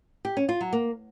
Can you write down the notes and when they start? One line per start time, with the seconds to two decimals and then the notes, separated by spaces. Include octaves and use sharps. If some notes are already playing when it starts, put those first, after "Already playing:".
0.25 G4
0.37 C#4
0.49 F4
0.61 F#3
0.73 A#3